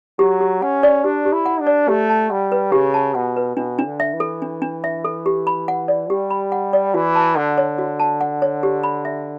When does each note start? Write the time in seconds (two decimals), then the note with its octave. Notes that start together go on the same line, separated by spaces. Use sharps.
0.19 F#3 G4
0.40 G4
0.62 C#4 F#5
0.83 D5
1.04 D4 G4
1.25 G4
1.33 E4
1.46 F#5
1.61 D4
1.67 D5
1.88 A3 G4
2.10 A5
2.30 G3 F#5
2.52 B4
2.72 C#3 G4
2.94 A5
3.15 B2 F#5
3.36 B4
3.57 B2 D4
3.78 D4
3.85 D3
4.00 E5
4.13 E3
4.20 A4
4.42 D4
4.62 D4
4.84 E5
5.04 A4
5.26 G4
5.47 B5
5.68 F#5
5.88 D5
6.10 G3 G4
6.30 B5
6.52 F#5
6.73 D5
6.94 E3 F#4
7.15 A5
7.36 D3 F#5
7.58 C#5
7.78 F#4
8.00 A5
8.21 F#5
8.42 C#5
8.63 G4
8.83 B5
9.05 E5